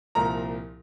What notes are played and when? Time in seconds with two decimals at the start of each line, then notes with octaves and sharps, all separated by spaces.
0.15 C2 A#2 F3 A#5